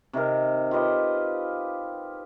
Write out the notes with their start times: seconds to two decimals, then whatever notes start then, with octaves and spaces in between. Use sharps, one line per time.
0.13 C3 D#3 D#4 A#4
0.71 F4 G4 B4 D#5